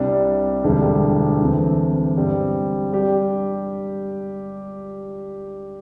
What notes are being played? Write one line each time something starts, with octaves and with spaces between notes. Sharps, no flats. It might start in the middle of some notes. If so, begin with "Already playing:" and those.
Already playing: C2 C3 G3 D4
E1 D2 D3 G3 D4
D2 C3 E3 A3 C4
G1 G2 G3 C4
G3 D4 G4